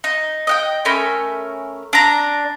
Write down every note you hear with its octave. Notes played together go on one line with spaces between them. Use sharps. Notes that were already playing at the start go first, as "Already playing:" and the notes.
D#4
D#5 F#5 G5
A3 C#4 A#4 B5
D4 A#5